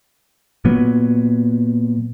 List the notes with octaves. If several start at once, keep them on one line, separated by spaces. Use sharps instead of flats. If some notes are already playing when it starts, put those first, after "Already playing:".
A#2 F#3 B3